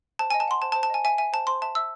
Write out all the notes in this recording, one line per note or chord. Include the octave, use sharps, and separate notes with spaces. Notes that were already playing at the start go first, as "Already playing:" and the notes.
C5 A5
D#5 G#5
A5
F#5 C6
C5 A5
A5
C5
A5
D#5 G#5
E5 G#5
E5 G#5
C5 A5
C5 C6
E5 A5
E5 E6